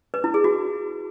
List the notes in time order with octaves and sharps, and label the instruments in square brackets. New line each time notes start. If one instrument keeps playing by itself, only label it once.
[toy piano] B4
E4
G#4
F#4